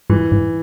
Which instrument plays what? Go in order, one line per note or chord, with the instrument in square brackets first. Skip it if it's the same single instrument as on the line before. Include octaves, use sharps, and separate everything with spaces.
[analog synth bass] G#2 [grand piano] E3
[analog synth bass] G#2